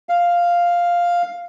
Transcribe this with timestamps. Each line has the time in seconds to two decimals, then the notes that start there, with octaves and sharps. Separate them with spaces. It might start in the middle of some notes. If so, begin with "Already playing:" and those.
0.09 F5